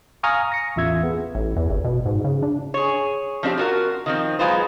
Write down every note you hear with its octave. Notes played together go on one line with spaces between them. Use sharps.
F5 G#5 A#5 C#6 D#6 F6
A#6 C#7
A1 E2 F4 E5 E6 G#6
B3 G#4
A1
E2
G1
B2
G#2
C#3
D4
G#4 C#5
F3 C4 D4 E4 G4
F4 F#4 A#4
D#3 F3 C4
F#3 G#3 F4 B4 C5